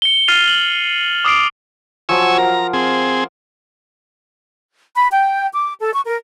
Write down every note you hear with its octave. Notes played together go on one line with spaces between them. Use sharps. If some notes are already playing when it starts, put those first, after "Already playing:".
C#7 G7
F6 A6 C7 D#7 F7
F#7
D6 D#6 F6 C7 D7
F3 F#3 G#5 C#6 D#6 E6
A#4 F5 A#5
C4 G#4
B5
G5
D6
A4
C#6
A#4